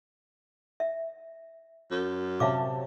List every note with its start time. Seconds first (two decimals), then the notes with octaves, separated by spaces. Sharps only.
0.80 E5
1.91 F#2
2.40 C3 C#5 E5 F5 A5 D6